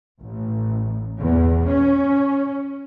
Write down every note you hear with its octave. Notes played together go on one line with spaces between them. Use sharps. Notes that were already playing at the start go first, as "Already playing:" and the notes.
A1
E2
C#4